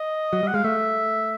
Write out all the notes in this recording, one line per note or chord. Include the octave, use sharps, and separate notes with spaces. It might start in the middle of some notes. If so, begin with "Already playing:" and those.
Already playing: D#5
F#3
G3
F#5
G#3 F5
A3 E5